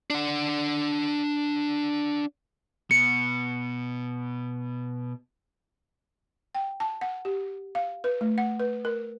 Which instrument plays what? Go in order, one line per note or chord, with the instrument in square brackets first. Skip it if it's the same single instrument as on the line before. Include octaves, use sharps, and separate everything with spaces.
[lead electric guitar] D4 F#5
[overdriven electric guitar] B2 [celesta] C#7
[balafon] G5
A5
F#5
G4
F5
B4
A3
F#5
B4
A#4